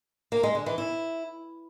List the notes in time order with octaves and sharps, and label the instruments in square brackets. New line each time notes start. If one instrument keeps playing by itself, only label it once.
[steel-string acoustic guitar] A#3
G#3
D3
E3
E4